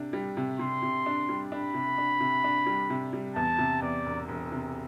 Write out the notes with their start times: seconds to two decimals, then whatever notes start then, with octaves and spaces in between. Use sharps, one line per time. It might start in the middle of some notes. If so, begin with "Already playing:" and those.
Already playing: C3 D4
0.13 G3
0.37 C3
0.59 C3 C6
0.82 C3
1.06 D4
1.29 G3
1.52 D4 B5
1.74 C3
1.98 D4
2.20 C3
2.44 D4
2.66 G3
2.90 C3
3.13 G3
3.36 E2 A5
3.59 C3
3.82 E2 D5
4.06 E1
4.29 E1
4.52 C3